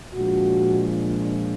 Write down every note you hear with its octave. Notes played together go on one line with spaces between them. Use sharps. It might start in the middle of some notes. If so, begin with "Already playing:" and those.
A#2 F3 G#3 D4 F#4